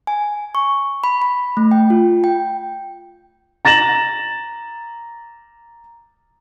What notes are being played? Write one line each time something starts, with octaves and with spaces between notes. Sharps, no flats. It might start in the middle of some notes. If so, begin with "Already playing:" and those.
G#5
C#6
B5
B5
A3
G5
F4
G5
A#5 A6 A#6 E7 F#7